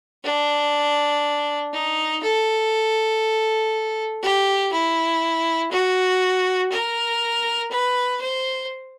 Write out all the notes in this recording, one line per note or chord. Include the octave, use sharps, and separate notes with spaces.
D4
D#4
A4
G4
E4
F#4
A#4
B4
C5